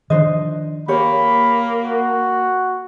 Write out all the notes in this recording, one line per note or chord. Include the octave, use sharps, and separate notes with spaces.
D#3 F3 D4 C5 D#5
A#3 G4 C#5 B5
F#4